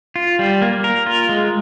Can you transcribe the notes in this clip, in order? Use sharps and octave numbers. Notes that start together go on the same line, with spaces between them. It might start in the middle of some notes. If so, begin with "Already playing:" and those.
F4
G3
A#3
A#4
F4
G#3